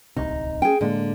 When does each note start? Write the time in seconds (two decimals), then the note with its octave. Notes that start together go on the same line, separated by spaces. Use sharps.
0.17 D1 C2 C3 D#4
0.62 C#4 G#4 G5
0.81 A2 D3 G#3 A#3